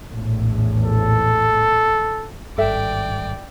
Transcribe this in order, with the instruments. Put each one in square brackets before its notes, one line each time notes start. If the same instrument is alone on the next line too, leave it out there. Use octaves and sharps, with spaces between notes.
[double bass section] A#1 E2 A2
[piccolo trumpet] A4
[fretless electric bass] G#1 G2 [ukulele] A4 E5 [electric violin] D5 G5